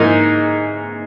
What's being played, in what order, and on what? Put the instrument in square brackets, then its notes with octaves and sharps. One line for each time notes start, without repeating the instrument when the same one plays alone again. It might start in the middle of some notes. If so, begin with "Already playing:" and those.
Already playing: [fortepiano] G#2 E3 A#3 D#4